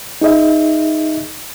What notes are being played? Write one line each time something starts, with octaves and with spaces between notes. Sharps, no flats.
D#4 G#4 D#5 E5